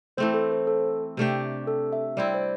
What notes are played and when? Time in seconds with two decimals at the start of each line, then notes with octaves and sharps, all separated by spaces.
0.17 E3 A3 C4 C5
0.34 A4
0.52 C5
0.67 A4
1.17 C3 A3 D4 G4
1.67 A4
1.93 E5
2.17 G3 C4 E4 D5
2.34 C5